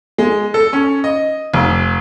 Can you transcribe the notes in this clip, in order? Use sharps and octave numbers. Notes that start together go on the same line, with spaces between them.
G#3
A4
C#4
D#5
F1